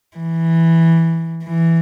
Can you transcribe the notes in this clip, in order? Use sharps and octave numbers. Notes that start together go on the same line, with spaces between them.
E3
E3